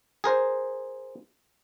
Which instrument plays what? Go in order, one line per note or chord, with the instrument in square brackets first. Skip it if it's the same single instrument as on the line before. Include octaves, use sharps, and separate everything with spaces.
[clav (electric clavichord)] G#4 A#4 C5